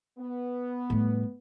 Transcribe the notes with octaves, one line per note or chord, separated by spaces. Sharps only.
B3
A2 G3